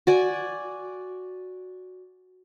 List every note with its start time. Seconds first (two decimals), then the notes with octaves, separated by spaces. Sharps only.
0.07 F#4 D5 G#5